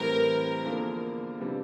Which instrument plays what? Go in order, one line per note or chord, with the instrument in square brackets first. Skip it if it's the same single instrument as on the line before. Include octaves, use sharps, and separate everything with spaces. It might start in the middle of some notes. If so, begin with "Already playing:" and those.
Already playing: [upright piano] A2 E3 G3 C4 [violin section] A#4
[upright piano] E2 D3 F3 A#3 F4
C3 E3 G3 D4 F4